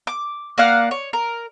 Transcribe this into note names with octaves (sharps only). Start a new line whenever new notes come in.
D6
A#3 D5 F5 F#5
C#5
A#4